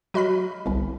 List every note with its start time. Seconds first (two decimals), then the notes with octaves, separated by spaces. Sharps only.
0.14 F#3 F#4 D#5 B5 F6 B6
0.66 G1 C2